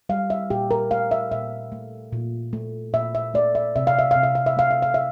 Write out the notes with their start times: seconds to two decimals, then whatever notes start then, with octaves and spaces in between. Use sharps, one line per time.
0.09 G3 F5
0.30 E5
0.50 A#2 G4
0.71 A#4
0.91 A3 F5
1.11 E5
1.31 A#2 E5
1.72 A3
2.13 A#2
2.53 A3
2.93 A#2 E5
3.15 E5
3.34 A3 D5
3.55 E5
3.76 C3 E5
3.87 F5
3.99 E5
4.11 C3 F5
4.23 E5
4.35 F5
4.46 E5
4.57 A3 F5
4.71 E5
4.82 F5
4.94 E5